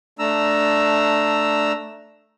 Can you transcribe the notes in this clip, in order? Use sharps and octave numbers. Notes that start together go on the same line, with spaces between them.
A3 D4 A#5 E6